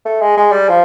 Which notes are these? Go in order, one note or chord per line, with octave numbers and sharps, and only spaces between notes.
A3
G#3
G#3
G3
F3